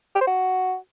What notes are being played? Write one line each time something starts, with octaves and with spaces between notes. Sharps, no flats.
G4
C5
F#4